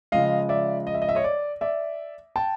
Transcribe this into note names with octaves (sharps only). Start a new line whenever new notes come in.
C#3 F3 G#3 D#5 F5
D5 E5
D#5
E5
D#5
E5
C#5 D#5
D5
D5 E5
G5 A5